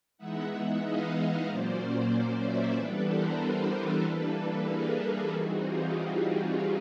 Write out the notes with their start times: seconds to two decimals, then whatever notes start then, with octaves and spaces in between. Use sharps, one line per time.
0.18 E3 G#3 B3 D#4 E5 F#5
0.82 D#5 F5
1.47 A#2 F#3 A#3 C#4 C5 D5
2.43 D5 E5
2.75 E3 G3 B3 D4 A4 B4
3.07 A#4 C5
3.39 A4 B4
4.04 E3 G3 A#3 D4
4.67 G#4 A#4
5.31 E3 G3 C4 D#4 F#4 G#4
5.63 F4 G4